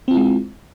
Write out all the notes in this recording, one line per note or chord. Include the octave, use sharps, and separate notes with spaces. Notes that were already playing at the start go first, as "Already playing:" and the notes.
G#3 C4 E4 F4